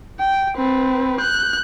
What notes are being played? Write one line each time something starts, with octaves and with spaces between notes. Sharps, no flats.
G5
C4 B4
F#6 G6